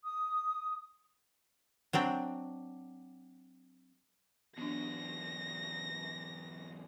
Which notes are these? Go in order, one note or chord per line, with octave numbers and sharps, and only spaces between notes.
D#6
F#3 C4 D4 G5
E2 F#3 B3 D4 A#6